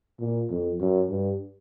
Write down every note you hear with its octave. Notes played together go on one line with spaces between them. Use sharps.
A#2
F2
F#2
G2